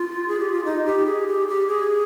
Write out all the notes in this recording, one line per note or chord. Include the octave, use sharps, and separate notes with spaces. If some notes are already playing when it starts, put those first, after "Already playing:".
Already playing: F4
G#4
G4
F4
D#4
G4
G#4
G4
G4
G#4